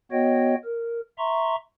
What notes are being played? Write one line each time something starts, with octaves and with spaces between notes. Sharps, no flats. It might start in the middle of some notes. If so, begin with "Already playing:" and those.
B3 F#4 C#5 D#5 G5
A#4
E5 A#5 C6 C#6